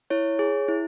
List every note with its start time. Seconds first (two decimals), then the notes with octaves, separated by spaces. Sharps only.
0.10 E4 C#5
0.39 G#4
0.68 E4